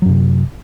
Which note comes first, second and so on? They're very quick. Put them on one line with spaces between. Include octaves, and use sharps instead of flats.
F#3 F#2 C3